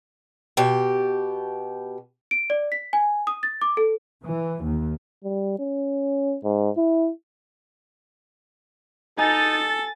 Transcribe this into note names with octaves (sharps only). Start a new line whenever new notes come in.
B2 G4
D7
D5
B6
G#5
D#6
A6
D6
A4
E3
D#2
G3
C#4
G#2
E4
D#4 A4 G#5 A6